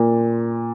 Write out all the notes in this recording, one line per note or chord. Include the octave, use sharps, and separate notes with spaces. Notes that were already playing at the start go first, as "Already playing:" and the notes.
Already playing: A#2